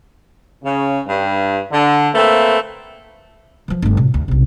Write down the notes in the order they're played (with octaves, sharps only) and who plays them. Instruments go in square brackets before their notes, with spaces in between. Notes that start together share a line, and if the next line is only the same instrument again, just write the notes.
[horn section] C#3
G2
D3
A3 A#3 C4 B4 E5
[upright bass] E3 F3
G1 A3
A2 C3
D2
B1 C3